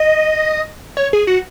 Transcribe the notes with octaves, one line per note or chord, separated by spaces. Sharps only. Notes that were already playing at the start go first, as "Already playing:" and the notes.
Already playing: D#5
C#5
G#4
F#4